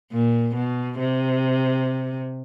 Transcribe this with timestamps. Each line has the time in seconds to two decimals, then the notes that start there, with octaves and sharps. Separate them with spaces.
0.12 A#2
0.55 B2
0.99 C3